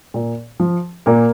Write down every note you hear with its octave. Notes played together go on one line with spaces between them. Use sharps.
A#2
F3
A#2 A#3